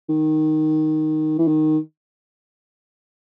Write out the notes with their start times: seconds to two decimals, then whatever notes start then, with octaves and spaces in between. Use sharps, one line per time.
0.09 D#3
1.38 E3
1.47 D#3